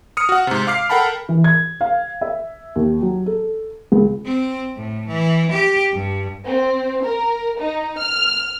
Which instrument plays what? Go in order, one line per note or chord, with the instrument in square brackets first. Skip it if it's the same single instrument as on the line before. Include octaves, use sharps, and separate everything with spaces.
[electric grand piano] D#6 F6 C#7
F#4 F#5
G#2 C3
F5 D6 F6 C7
A4 A#4 F#5 G5 A5 B5
[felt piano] E3
G#6
F5
E5
D#2
F#3
A4
C#2
[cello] C4
A2
E3
G4
G2
[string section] C4
A#4
D#4
F6